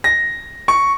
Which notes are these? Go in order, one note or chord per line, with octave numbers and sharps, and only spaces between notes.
A#6
C#6